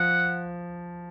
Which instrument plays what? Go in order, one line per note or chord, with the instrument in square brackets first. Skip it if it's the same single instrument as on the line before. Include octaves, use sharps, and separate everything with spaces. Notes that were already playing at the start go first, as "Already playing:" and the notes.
Already playing: [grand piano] F3 [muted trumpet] F#5